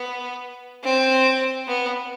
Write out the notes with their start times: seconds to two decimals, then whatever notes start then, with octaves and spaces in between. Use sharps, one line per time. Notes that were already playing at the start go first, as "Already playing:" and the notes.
Already playing: B3
0.84 C4
1.68 B3